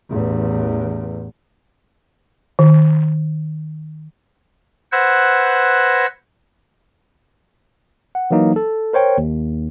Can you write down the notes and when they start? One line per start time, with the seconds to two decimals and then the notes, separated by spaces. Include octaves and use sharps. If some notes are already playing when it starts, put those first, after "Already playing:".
0.10 A1 E2
2.59 D#3
4.92 B4 C5 F#5 E6 G#6 A#6
8.15 F#5
8.31 E3 F#3 A#3 D#4
8.56 A4
8.93 A#4 C5 C#5 G5
9.18 D#2